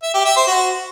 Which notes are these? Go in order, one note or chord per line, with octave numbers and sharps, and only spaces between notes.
E5
G4
E5
C5
F#4